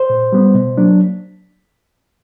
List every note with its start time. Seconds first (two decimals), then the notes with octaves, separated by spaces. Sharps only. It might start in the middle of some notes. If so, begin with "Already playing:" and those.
Already playing: C5
0.10 A#2
0.33 G3 B3
0.54 B2
0.77 F#3 A#3 D4